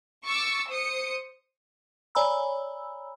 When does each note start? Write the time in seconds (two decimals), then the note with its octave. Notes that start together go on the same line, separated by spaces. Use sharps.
0.25 C#6 D6 E6 A6
0.69 C5 D#6 C#7
2.15 C#5 D5 G#5 A#5 B5 E6